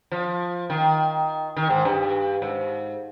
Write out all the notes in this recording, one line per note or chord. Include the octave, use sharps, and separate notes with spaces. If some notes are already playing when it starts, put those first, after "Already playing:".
F3
D#3
D#3
G#2
G2
G#2